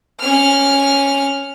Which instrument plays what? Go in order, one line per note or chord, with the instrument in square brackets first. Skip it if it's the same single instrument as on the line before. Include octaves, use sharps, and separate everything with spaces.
[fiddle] C#4 F6